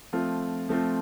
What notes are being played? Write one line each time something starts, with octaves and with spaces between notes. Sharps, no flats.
F3 A3 C4 F4
F3 A3 C4 F4